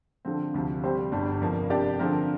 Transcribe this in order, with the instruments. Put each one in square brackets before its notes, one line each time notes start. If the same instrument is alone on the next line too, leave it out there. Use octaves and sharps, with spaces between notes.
[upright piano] D3 F3 C4
D2 C3 F3
C3 G3 C4 G4 C5
G1 G2 G3 D4
F1 F2 F3 A#3
C3 A#3 D4 G4 D5
D3 F3 C4 A#4